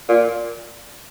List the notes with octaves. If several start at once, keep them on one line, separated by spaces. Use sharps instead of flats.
A#2